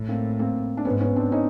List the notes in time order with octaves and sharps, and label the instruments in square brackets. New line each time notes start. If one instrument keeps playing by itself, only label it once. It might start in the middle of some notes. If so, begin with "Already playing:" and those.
Already playing: [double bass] A2
[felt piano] A#3 C4
A#3 C4
D4
[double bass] G#2 [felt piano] B3 C#4
[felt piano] B3 C#4
C4 D4
C#4 D#4